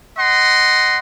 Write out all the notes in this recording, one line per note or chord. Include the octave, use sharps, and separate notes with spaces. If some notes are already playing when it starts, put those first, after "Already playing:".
D#5 F#5 C6